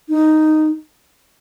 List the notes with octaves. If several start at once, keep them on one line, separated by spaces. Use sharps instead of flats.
D#4